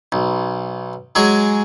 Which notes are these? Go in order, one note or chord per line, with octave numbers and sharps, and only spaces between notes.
B1
F#3 G#3 G#4